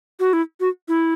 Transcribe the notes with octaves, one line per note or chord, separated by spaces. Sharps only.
F#4
E4
F#4
E4